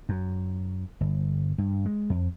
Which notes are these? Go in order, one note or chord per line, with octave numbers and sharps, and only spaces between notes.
F#2
G1
G2
G#3
F2